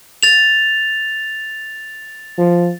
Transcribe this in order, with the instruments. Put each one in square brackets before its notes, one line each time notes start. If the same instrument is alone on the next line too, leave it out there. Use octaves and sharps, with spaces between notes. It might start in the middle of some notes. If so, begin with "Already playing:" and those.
[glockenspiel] A6 F7
[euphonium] F3